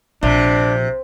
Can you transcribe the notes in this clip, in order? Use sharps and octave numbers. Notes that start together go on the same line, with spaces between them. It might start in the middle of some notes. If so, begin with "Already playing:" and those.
A#1 C3 D4